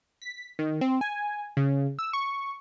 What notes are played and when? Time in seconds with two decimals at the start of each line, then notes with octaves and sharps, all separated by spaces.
0.22 B6
0.59 D#3
0.81 C4
1.01 G#5
1.57 C#3
1.99 E6
2.13 C#6